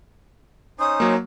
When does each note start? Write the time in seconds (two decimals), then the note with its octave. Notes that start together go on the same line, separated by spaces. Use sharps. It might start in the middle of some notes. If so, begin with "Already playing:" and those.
0.80 C#4 D#4 C5 D#6
1.00 F#3 A#3